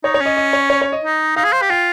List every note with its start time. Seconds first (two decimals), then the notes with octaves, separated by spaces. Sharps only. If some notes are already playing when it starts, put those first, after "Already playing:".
0.04 D#4 C#5
0.14 C#5
0.20 C#4
0.26 D#5
0.37 D#5
0.53 C#5
0.70 C#5
0.82 C#5
0.92 D#5
1.03 D#4
1.36 D#4 F5
1.44 G#4
1.52 C5
1.61 G4
1.70 F4 G5